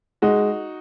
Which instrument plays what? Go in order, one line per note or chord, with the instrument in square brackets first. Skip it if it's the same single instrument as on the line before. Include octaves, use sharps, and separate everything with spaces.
[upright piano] G#3 [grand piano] D#4 F#4